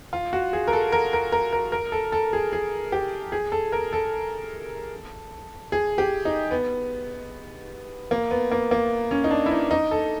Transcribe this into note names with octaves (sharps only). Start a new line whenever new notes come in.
F4
F#4
G#4
A#4
A4
A#4
A#4
A#4
A#4
A#4
A4
A4
G#4
G#4
G4
G#4
A4
A#4
A4
G#4
G4
D#4
B3
A#3
B3
A#3
A#3
C#4
D#4
D4
E4
D#4
D#4
A4